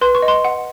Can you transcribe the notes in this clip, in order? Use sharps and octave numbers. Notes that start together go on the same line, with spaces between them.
B4 C6
C#6
D#5
C6
F#5